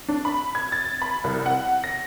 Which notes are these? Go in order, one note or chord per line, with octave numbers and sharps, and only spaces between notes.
D4
B5
G#6
A6
B5
C2
F#5
A#6